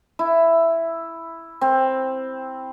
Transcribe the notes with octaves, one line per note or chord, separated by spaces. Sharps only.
E4
C4